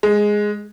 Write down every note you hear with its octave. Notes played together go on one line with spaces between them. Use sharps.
G#3